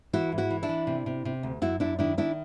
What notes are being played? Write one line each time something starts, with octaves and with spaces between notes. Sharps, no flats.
E3 E4 F#4
G#2
E4 F#4
E3
D4 E4
E3
C3
C3
C3
D2
F#2 E4 F#4
F#2 D4 E4
D#3 D4 E4
D#3 D4 E4